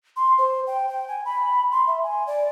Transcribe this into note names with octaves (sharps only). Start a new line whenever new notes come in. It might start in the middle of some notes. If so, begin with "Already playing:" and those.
C6
C5
G5
G5
G#5
B5
C6
E5
G#5
D5